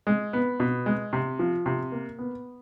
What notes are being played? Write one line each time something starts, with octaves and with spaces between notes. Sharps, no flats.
G#3
B3
B2
G#3
C3
F3
C3
A#3
B3